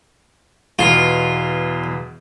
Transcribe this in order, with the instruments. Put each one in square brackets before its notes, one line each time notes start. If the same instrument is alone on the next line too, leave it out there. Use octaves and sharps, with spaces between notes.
[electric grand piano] E2 B2 [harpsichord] F4